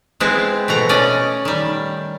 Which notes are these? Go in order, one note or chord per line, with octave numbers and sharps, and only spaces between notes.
G#3 B3 C4 E4
B2 A3 F#5 A#5
C#4 D5 D#5
D#3 G3